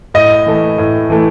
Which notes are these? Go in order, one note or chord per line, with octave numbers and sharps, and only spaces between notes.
A2 D#5
E3 A3
A2
E3 A3